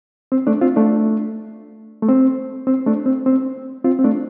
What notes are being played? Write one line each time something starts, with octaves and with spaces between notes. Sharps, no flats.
C4
A3 D4
C4 F4
A3 D4
A3
C4
C4
A3 D4
C4
C4
C4 F4
C4
A3 D4